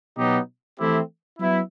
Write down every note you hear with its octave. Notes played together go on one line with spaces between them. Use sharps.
B2 F#3 B3 D#4 G4
E3 A3 C4 E4 G4
F#3 B3 E4